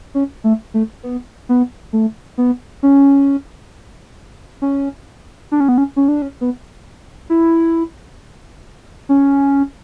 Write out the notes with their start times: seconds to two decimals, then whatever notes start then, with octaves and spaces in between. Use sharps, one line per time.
0.15 C#4
0.44 A3
0.74 A3
1.03 B3
1.49 B3
1.93 A3
2.38 B3
2.83 C#4
4.62 C#4
5.52 D4
5.60 C#4
5.69 B3
5.78 C#4
5.96 C#4
6.08 D4
6.22 C#4
6.41 B3
7.30 E4
9.09 C#4